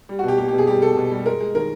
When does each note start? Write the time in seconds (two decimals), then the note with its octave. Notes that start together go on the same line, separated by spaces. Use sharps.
0.09 G3
0.19 F#4
0.23 B2 G4
0.38 A#3 G4
0.48 G4
0.53 B2
0.58 G#4
0.67 G3 G4
0.82 B2 A4
0.96 B2
1.11 G3
1.26 G#3 A#4
1.40 G#3
1.54 D#3 A#4